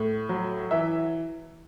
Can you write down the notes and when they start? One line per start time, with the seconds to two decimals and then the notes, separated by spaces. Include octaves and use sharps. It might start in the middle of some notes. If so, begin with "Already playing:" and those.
Already playing: A2
0.29 F#3
0.71 E3 E5